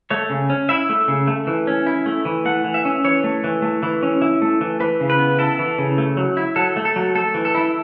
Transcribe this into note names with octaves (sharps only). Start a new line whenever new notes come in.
A3 C#5
C#3
C#4
E4 E5
A3
C#3
A3
E3
C#4
E4
A3
E3
A3 F#5
E3
E5
C#4
E3 C#5
A3
E3
A3
E3
C#4
E4
A3
E3
E3 B4
C#3
B4
B3
E4 A4
E3
C#3
A3
F#3
E4
F#3 A4
A3
A4
F#3
A3 A4
E3
A4
E4